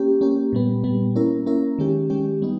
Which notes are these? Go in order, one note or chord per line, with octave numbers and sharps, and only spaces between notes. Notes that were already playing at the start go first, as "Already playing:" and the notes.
Already playing: A#3 C#4 G4
A#3 C#4 G4
A#2 G3 B3
A#2 G3 B3
A#3 C#4 E4 A#4
A#3 C#4 E4 A#4
D#3 G#3 C#4 G4
D#3 G#3 C#4 G4
G3 B3 D#4